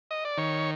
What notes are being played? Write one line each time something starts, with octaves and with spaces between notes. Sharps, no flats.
D#5
D5
D#3 C#5